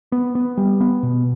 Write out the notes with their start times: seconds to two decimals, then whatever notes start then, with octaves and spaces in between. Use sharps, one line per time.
0.12 B3
0.35 B3
0.58 G3
0.81 B3
1.03 B2